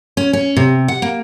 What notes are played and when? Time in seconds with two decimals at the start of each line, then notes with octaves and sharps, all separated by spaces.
0.17 C#4
0.33 C#4
0.57 C3
0.88 F#5
1.02 A#3